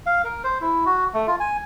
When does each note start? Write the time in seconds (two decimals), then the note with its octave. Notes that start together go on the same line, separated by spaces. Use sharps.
0.06 F5
0.24 A#4
0.44 C5
0.61 E4
0.86 F#4
1.14 A3
1.27 F4
1.40 G#5